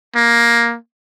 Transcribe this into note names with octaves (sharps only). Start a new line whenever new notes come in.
A#3